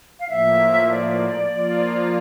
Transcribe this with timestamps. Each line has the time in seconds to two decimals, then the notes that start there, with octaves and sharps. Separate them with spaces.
0.20 F5
0.29 A2 F3 A#3 E5
0.90 D5
1.52 F3 A#3 F4